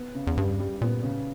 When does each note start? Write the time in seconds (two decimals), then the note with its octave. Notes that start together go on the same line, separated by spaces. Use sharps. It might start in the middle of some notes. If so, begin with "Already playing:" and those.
Already playing: B3
0.15 C#3
0.27 E2
0.37 G2 G3
0.60 G3
0.81 A#2 B3
1.03 C#3